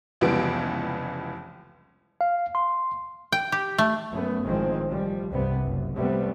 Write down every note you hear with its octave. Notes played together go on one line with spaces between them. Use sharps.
F1 C#2 E3 G3 B3 D7
F5
C6
G5
G4
A3
F#2 A3 B3
A1 D#3 F3 G#3 C4
F3 G3
C2 G2 C3 G3 B3
F#1
C3 G3 A3 B3 C4